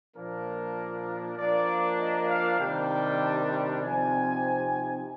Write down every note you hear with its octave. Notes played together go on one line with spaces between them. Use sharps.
A#2 F3 A#3 D4 A#4
F3 A#3 D4 D5
D#5
F5
C3 D#3 G3 D4 G5
C3 F3 C4 D#4 G#5